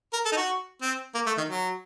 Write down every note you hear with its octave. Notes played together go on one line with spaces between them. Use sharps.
A#4
A4
D#4
F#4
C4
A#3
A3
D#3
F#3